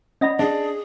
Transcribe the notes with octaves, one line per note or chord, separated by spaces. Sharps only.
C#4 D5 D#5 F#5 B5 A#6
D4 G#4